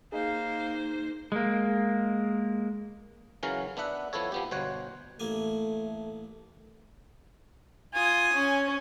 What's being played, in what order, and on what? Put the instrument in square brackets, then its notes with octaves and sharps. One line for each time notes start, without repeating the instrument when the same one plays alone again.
[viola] A#3 C5 [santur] D#4 [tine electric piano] G#4 D#5 [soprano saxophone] F5
[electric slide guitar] G#3 A#3
[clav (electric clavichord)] C#3 E3 F#3 C#4 A#4 F5
B3 D4 E5 F#5
F3 B3 E4 A4 C#5
F3 B3 G4
G1 B2 C5 C#5 F#5
[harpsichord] A1 A#3 G#5 [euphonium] A3
[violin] F4 D#6 [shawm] G#5
[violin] C#4